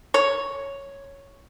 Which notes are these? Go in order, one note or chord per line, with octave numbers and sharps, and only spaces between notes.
C#5